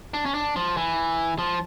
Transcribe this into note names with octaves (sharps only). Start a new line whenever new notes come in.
D4
C#4
D4
F3
E3
F3